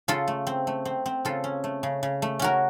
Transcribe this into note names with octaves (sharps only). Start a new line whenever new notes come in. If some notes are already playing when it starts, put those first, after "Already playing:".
C#3 F4 A4
A3
C4
A3
C4
C4
C#3 F4 A4
C#4
A3
C#3
C#3
A3
C#4 F#4 A#4